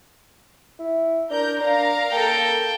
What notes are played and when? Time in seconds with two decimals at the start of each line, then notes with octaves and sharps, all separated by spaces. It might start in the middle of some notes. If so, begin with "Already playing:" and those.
0.79 E4
1.30 D4 A#4 G6
1.61 D4 A#4 F5 A#5
2.12 A#3 A4 G5